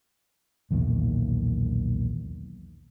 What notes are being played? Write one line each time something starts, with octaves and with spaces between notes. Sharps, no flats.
B1 E2 A#2 D#3